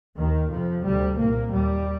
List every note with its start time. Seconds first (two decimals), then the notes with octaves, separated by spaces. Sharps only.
0.18 D#2 D#3
0.51 F2 C3 F3
0.84 D2 C3 G3
1.18 C2 A#2 A#3
1.52 D#2 G3